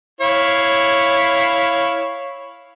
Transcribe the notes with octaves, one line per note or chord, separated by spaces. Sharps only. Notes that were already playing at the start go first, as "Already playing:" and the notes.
E4 C#5 F5